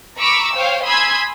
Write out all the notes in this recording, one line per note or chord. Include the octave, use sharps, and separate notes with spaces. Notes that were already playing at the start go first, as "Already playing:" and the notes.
A#5 B5 C#6 D6 E6
C5 C#5 F5 G5
G#5 B5 C6 D#6 E6 G#6